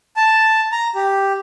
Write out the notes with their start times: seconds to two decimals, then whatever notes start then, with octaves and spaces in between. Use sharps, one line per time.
0.16 A5
0.72 A#5
0.95 G4